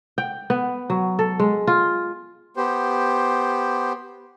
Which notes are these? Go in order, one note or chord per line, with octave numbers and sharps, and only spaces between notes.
G5
B3
F#3
A4
G#3
F4
B3 G4 C5